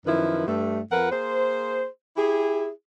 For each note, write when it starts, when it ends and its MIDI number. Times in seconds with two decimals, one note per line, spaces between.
0.06 0.44 42
0.06 0.44 51
0.06 0.44 53
0.06 0.44 64
0.06 0.44 71
0.47 0.80 43
0.47 0.80 57
0.92 1.07 41
0.92 1.07 53
0.92 1.07 70
0.92 1.07 71
0.92 1.07 78
1.11 1.87 58
1.11 1.87 68
1.11 1.87 72
2.17 2.69 64
2.17 2.69 67
2.17 2.69 68